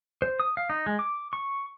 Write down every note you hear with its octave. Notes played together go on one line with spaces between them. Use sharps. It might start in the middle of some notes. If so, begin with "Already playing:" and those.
C5
D#6
F5
D#4
G#3
D6
C#6